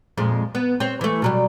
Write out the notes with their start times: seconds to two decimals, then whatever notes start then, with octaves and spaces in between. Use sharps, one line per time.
0.18 F2 A#2 G#3
0.55 B3
0.80 C4 C#5
1.01 E3 A3
1.22 B2 F#3 G3